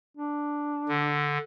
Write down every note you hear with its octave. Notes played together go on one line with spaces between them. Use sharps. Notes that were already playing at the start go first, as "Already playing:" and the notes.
D4
D3